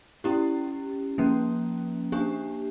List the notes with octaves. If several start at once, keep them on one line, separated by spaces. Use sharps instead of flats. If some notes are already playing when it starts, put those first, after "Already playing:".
C#4 E4 G4
F3 A#3 C#4
A#3 D4 G4